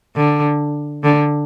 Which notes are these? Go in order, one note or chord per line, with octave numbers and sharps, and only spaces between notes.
D3
D3